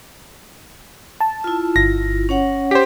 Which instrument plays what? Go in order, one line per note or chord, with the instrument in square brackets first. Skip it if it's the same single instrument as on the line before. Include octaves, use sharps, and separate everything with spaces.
[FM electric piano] A5
[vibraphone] E4 F4
[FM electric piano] G1 [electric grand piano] A#6
[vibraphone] C#4 C#5 F#5
[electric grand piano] G4 C5 [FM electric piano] B6